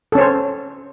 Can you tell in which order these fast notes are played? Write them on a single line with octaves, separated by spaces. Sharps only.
A4 C#4 C#5 C5